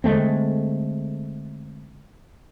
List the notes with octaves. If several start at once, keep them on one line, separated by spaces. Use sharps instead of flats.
D3 G#3 A3 C4